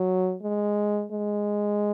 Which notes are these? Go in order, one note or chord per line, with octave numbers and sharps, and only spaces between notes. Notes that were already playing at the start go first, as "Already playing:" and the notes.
Already playing: F#3
G#3
G#3